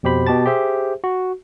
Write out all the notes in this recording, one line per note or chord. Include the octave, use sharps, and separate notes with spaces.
F2 B2 G4 C5 B5
B2 G4 A5 A6
G4 G#4 C5 E5
F#4